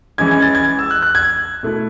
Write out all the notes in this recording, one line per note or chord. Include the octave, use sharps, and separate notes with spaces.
E3 G#3 C#4 G#6
G#6
A6
G#6
E6
F#6
F#6
G#6
B2 A3 E4